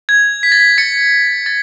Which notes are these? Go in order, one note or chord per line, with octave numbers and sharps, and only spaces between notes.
G#6
B6
A6
B6
A6 C#7
A6